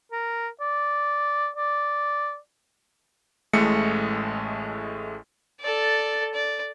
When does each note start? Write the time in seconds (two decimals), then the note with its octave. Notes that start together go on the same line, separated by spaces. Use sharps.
0.12 A#4
0.60 D5
1.57 D5
3.53 A1 A2 G#3 A3 C#7
5.61 A4 D5
6.34 D5